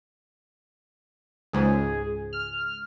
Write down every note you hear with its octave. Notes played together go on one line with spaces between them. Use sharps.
C#2 G#2 G#4
F6